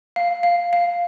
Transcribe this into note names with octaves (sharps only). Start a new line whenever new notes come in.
F5
F5
F5